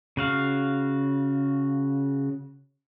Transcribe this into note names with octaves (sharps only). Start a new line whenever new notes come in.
C#3 F#4 F5